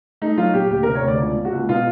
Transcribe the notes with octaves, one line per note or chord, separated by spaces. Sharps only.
A3 D#4
F#3 F4
A#2 G4
D2 G4
C3 A#4
C#5
D2 D5
C#2
A#3
F#4
C#2
B2 F4